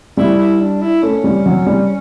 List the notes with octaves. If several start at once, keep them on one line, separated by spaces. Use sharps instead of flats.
G3 E4
E4
D4
E4
A3 C#4
G3
F#3
G3